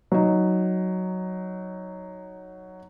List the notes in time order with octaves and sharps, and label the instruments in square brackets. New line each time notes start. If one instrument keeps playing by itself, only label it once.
[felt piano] F#3 D#4